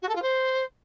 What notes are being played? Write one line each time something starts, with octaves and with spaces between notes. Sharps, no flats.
F#4
A4
F4
C5